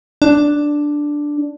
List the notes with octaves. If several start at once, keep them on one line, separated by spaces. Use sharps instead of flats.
D4